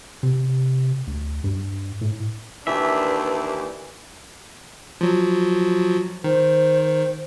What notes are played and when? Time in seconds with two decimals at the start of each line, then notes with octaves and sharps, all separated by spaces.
0.23 C3
1.07 D2
1.44 G2
2.01 A2
2.67 D#2 E3 D4 B4 D5 E5
5.01 F3 F#3
6.24 D#3 C5